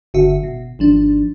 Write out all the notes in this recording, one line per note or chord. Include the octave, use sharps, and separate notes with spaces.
G1 D3 F#4 E5
B2
G#1 F3 D4